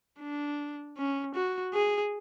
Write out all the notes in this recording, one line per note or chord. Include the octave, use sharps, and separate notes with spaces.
D4
C#4
F#4
G#4